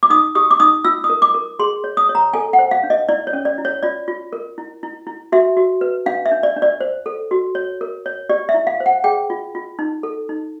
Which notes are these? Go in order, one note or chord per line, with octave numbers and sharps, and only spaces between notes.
D6
D#4 D#6
G4 D#6
D6
D#4 D#6
F4 E6
D#6
A#4
D6
A#4
G#4 C6
C#5
D#6
C#5
A#5
A4 G#5
F#5
C5
F5
D4
D#5
E4 D5
C#5
C#4
D5
E4
C#5
F4 D5
F4
A#4
E4
E4
E4
F#4 E5
F#4
B4
D4 F5
E5
D4
D5
D4
D5
C5
A4
F#4
C#5
A#4
C#5
G4 D5
E5
E4
F5
C5
F#5
G#4 G5
F4
F4
D#4
A4
D#4